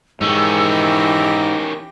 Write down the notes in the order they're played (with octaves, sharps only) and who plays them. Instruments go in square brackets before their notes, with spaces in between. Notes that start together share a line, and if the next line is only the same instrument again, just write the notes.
[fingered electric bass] G#2 [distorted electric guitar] D#3 C#4 [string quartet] E3 G4 A#6 [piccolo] E6